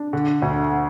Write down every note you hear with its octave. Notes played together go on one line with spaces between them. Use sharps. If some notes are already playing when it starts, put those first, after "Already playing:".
Already playing: D4
D3
D2